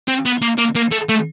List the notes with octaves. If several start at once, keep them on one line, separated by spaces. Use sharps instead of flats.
C4
B3
A#3
A#3
A#3
A3
A3